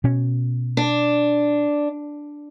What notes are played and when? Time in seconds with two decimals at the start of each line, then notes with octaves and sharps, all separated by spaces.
0.04 B2 C#4
0.77 D4